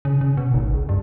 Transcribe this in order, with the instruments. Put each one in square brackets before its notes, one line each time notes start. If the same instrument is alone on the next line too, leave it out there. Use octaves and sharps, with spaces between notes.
[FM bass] C#3
C#3
B2
G#1
C#2
G2